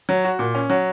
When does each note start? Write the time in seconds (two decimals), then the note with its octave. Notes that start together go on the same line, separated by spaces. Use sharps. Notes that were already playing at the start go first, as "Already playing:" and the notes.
0.09 F#3
0.25 F#4
0.39 A#2
0.55 C#4
0.70 F#3